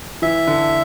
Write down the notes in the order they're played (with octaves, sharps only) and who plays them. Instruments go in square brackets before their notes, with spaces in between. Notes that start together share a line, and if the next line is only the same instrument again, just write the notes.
[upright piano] E3 [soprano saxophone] E5
[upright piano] D3